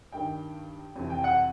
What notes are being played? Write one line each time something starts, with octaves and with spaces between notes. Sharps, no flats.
G2 D#3 G5
F2 C3 E3
G5
F#5